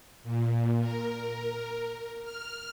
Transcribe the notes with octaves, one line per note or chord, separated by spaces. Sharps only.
A#2
A#4
F6